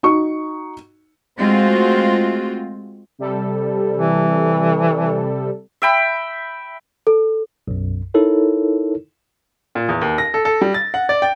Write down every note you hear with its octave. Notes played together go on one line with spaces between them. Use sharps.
D#4 F#4 C#6
G#3 A3 C4 F4 F#4
C3 G3 A4
E3
E5 G5 B5
A4
B1 F#2
D#4 E4 A4 A#4 C#5
A#2
E2
D#2
A#6
A4
A4
G3
A6
F#5
D5
G5